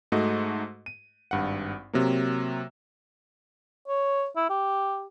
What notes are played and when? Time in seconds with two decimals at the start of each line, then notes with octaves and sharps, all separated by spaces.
0.12 G#2 A3 F#4 D#5
0.86 D#7
1.31 G#1 G2 F#5
1.93 C3 F#3 A#3
3.88 C#5
4.36 E4
4.49 G4